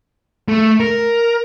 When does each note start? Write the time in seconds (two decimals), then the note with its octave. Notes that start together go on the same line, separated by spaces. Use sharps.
0.48 A3
0.80 A#4